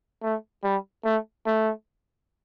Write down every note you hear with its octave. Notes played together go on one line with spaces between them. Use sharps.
A3
G3
A3
A3